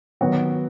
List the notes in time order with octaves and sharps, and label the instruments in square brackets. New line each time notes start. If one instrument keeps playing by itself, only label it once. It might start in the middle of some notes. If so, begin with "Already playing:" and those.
[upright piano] D#3 F#3 B3 F#4